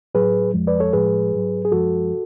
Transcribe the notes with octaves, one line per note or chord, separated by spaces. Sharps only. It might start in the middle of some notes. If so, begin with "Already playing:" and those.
A2 F#3 G#4 B4
F2 F3 G#3
B4 D5
A4 C#5
A2 F3 G#3 G#4 B4
G#2 F#3
G#4
F#2 F3 G#3 F#4 A4